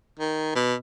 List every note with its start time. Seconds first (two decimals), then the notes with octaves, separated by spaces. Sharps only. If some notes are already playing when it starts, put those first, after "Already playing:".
0.19 D#3
0.55 B2